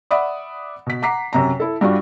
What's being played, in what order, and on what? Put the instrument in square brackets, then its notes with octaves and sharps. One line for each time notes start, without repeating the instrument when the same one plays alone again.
[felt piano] D5 E5 F#5 B5 D#6
B2 B6
F#5 A#5 D6 B6 C7
F#2 C3 A#5
E4 A4
G2 G3 D4 F4 F#4